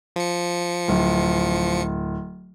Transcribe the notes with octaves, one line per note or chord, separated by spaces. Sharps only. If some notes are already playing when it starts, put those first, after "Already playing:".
F3 C#7
D1